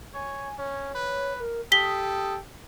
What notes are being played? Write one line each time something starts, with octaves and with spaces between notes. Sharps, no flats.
C#5 G#5
C#4 C#5
B4
A#4
G4 A4 D#6 B6 G7